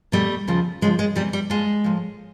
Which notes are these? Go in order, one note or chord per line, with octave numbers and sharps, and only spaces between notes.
E2 B2 G3 A3
D#2 C#3 F3
D2 C#3 F3 G#3
G#3
E2 C3 E3 G3
G3
G#2 F3 G#3
A2 F3